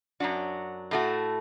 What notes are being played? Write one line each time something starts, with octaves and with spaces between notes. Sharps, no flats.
F#2 F#3 D4 F#4
A2 A3 F#4